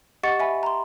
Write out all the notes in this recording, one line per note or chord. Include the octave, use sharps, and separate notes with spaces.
G4 D#5 F#5 C#6 A6 C#7
E5 G#5 B5
A#5 C6